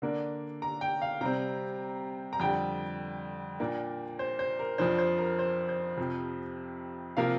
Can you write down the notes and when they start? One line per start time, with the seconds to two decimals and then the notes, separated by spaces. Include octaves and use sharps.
0.02 D3 A#3 D4
0.62 A#5
0.81 G5
1.02 F5
1.21 C3 G3 C4 A#5
2.33 A#5
2.40 F2 D3 G3 G5
3.60 A#2 A#3 D4
4.19 C5
4.39 C5
4.59 A#4
4.78 F2 F3 D4 C5
4.99 C5
5.18 A#4
5.39 C5
5.69 C5
5.98 F2 C3 F3
7.17 C3 F3 A#3 F5